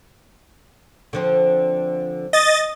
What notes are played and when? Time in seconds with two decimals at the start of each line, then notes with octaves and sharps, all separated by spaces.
1.13 D3 F3 C4
2.33 D#5 A6